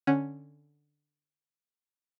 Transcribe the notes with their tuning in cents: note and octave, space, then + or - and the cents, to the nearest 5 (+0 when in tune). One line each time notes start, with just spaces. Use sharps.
D3 +5 C#4 +0 F#5 +0